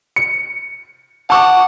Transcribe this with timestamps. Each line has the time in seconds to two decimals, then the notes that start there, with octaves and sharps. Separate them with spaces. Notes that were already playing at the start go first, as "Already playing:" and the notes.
0.16 C#7
1.30 F#5 A5 C#6 D6